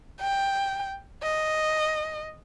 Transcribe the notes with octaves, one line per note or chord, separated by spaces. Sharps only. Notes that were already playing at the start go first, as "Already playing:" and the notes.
G5
D#5